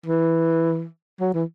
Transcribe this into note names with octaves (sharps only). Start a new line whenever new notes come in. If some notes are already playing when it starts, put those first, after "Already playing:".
E3
F#3
E3